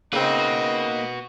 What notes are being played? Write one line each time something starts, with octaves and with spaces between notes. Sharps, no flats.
C#3 A#3 C4 D#4 F#4 B4 D#5